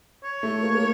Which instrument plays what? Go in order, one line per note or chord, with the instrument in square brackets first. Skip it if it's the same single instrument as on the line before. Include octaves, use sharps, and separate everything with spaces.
[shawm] C#5
[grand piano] A3
A#3
A#3